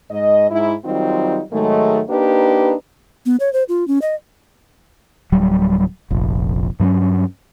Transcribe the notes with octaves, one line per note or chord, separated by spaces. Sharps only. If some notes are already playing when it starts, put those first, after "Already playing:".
G#2 D#5
G#2 E4
D#3 F#3 G3 C4 D#4 F4
G#2 D#3 F#3 G#3 A3
A#3 D4 D#4 G4 B4
B3
C#5
C5
F4
C#4
D#5
D1 F#3 G3
F1 A#1
G2 F#3 C4 C#4